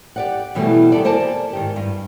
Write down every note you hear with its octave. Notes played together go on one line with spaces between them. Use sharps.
G4 D5 F#5
B2 E3 F#3 G3 A3
D#3 G4 A4 D5
A#3 C5 D5 G#5 A5
G#2 D#3 G4
G2